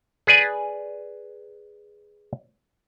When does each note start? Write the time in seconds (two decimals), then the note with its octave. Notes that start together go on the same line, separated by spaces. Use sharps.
0.27 G#4 B4 D5 G#5